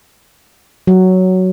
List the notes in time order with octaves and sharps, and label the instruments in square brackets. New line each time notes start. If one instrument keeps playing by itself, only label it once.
[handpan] F#3